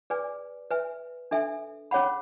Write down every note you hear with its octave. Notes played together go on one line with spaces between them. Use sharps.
G#4 B4 D5 G#5
B4 E5 G#5
D4 A4 E5 G#5
C#4 G#4 C#5 F#5 B5